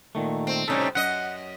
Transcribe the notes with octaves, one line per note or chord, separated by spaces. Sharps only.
A#2 D#3 A3
C4
A2 C3 G3 C#4 D#4 A4
F#2 D#5 F#5